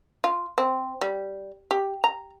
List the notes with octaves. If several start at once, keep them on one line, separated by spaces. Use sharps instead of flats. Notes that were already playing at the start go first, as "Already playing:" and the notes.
F4
C4
G3
G4
A#5